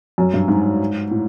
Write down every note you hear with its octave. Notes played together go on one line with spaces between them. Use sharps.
F#2
G2
G#2
A2